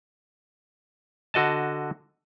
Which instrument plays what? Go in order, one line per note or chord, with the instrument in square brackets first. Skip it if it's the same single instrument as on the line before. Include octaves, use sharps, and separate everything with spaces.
[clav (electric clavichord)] D3 F#4 D#5 A5